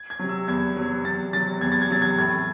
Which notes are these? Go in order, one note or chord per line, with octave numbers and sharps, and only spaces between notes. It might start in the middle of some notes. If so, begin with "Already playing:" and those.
Already playing: G#6
G#6
C3 F#3
E6
E2 G#6
C3 F#3
E2 A6
C3 F#3 A6
E2 G#6
A6
G#6
C3 F#3 A6
G#6
A2 G#6